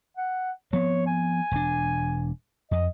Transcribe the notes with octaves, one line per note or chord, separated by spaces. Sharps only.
F#5
F3 B3 C4 C#5
G#5
E1 D4
F2 D#5